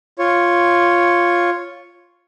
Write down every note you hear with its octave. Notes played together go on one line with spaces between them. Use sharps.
F4 C#5